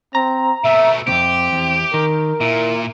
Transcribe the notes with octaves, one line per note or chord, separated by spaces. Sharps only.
C4 A#5
B2 A3 E5
C2 F2 C4 G4
E2
D#3 A#4
A#2 E4